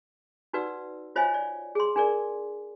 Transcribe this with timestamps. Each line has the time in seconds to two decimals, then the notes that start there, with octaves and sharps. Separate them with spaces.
0.53 D#4 F#4 B4 D5 F#5 E6
1.16 F4 C5 C#5 D#5 F5 G#5
1.34 D5
1.75 G#4 C6
1.96 D4 G#4 A#4 D5